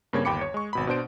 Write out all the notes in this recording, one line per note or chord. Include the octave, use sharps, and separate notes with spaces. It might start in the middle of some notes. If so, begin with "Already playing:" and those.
G2 C#3 A#3 C4 C#5 G#6
G1 D#2 G5 B5 D6 C#7
C#5
G#3 C#6
G#1 B2 B5
B2 D4 C5 D7